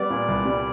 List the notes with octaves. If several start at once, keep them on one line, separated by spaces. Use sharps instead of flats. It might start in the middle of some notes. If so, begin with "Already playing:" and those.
Already playing: G3 B3 D5
A#2
C2
G3